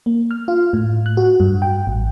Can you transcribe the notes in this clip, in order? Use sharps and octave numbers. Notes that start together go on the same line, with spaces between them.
A#3
F6
F4
A2
F#6
F#4
G2
G5
A1